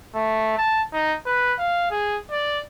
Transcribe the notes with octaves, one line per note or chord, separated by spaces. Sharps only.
A3
A5
D#4
B4
F5
G#4
D5